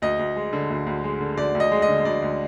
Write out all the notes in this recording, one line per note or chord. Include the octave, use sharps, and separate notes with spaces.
D2 D#5
D2
G#3
D3
D2
D2
G#3
D3
D2 D5
D2
D#5
G#3
D#5
D3
D2 D5
D2